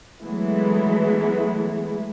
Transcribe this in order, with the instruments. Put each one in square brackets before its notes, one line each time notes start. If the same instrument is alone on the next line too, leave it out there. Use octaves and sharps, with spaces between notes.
[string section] E3 F#3 G#3 A3 B3 E4